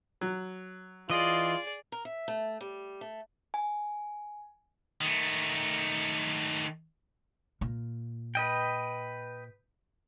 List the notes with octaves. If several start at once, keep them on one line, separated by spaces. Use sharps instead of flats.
F#3
E3 F4 G#4 D5 D#5
A#4
E5
A3
G3
A3
G#5
D#3 A3
A#2
B4 D#5 G5